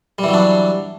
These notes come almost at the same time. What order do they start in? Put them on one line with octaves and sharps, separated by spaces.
G3 E3 F#3 D4